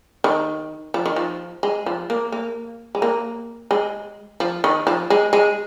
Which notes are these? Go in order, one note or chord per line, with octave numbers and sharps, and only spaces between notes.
D#3
F3
D#3
F3
G#3
F3
A#3
A#3
G#3
A#3
G#3
F3
D#3
F3
G#3
G#3